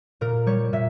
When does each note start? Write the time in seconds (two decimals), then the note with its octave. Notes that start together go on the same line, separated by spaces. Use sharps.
0.21 A#2 A#4
0.46 G3 C#5
0.73 A#2 E5